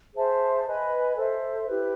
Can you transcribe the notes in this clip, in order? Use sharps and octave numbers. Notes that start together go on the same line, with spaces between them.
G#4 C5 E5 A5
B4 D#5 G#5 B5
A4 C5 E5
E4 G4 B4